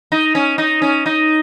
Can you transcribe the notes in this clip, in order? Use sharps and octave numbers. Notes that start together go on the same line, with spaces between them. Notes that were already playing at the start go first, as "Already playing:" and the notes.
D#4
C#4
D#4
C#4
D#4